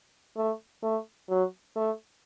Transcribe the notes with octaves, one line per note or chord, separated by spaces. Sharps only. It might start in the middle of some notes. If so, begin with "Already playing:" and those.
A3
A3
F#3
A3